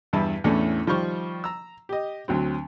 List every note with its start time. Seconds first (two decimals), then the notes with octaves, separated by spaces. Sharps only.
0.13 E2 G2 E4 A5
0.44 E2 A2 A3 C#4 D4
0.87 D#3 F3 G3 C5 C#6 F6
1.44 A#5 E6
1.89 G4 D#5
2.28 D2 F#3 C4